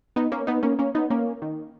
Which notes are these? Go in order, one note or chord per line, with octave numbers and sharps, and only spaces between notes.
B3 D#4
A#3 C#4
B3 D#4
A#3 C#4
A#3 C#4
B3 D#4
A#3 C#4
D#3